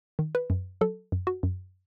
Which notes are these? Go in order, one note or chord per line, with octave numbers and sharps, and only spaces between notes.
D#3
B4
F#2
F#3 A4
F#2
F#4
F#2